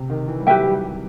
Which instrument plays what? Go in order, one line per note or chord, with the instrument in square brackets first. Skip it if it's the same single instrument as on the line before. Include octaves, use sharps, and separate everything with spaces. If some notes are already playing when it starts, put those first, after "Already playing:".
Already playing: [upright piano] C3
D#3
E3
G3
[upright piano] F#3 [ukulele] G4 B4 E5 G5
[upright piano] G3
G3